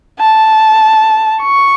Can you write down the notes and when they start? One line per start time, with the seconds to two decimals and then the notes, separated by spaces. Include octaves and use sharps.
0.20 A5
1.42 C#6